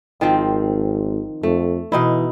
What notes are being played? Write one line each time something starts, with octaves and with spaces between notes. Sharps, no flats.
G#1 D#3 F3 C4
F2 A3
B2 E3 D#4 E4